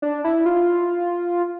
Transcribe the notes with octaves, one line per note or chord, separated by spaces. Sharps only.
D4
E4
F4